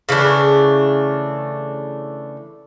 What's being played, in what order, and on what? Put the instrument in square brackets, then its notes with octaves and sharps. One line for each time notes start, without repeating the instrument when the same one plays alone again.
[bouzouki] C#3 E3 A3 D4